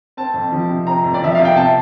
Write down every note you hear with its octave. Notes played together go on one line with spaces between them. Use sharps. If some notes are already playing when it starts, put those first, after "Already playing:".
C4 A5
F2
F3
C3
C4 A#5
F2
D5
F3 E5
C3 F5
G5
C3 A5